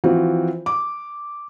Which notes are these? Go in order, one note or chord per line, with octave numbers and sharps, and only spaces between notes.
E3 F3 C4 F4 F#4
D6